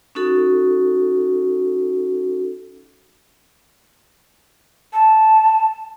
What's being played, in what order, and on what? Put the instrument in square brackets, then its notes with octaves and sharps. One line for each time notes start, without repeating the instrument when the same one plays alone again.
[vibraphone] C#4 D#4 F#4 A4
[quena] A5